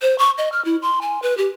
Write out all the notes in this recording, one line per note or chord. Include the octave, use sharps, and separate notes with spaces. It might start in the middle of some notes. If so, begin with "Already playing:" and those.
C5
C#6
D#5
F6
E4
C6
G#5
B4
G4